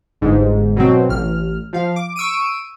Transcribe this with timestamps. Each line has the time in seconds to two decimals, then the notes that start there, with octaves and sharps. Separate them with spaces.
0.21 G1 G#2
0.76 B2 F#3 C4
1.09 A1 F6
1.73 F3 F5
1.96 D6
2.16 C#6 E6 D7 D#7